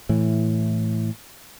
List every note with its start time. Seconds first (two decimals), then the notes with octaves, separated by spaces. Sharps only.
0.09 A2 E3